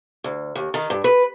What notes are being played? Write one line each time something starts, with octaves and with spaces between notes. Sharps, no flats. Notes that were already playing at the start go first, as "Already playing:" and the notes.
D2
D#2
D#3
G2
B4